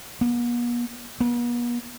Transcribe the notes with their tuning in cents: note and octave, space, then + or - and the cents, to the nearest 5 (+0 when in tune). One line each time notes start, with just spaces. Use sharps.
B3 -45
B3 -45